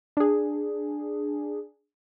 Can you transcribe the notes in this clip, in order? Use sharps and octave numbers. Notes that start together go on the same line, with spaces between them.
D4 G#4